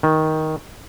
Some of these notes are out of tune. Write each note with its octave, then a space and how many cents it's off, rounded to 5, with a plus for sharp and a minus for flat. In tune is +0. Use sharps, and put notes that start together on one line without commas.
D#3 +10